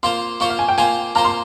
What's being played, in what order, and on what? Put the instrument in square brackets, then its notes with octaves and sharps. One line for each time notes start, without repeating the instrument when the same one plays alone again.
[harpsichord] A#3 F4 C5 [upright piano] C6
[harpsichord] A#3 F4 C5 [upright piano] C#6
[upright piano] F5
G#5
G5
[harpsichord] A#3 F4 C5 [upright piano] G#5
[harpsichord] A#3 F4 C5 [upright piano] A#5
[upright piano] C6